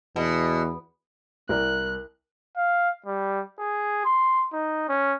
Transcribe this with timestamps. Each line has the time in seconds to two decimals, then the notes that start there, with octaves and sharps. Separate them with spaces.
0.16 E2 B2
1.49 C2 A#4 D5 F#6
2.57 F5
3.06 G3
3.59 G#4
4.05 C6
4.53 D#4
4.88 C#4